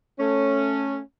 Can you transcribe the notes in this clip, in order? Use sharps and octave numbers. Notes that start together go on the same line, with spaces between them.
A3 C#4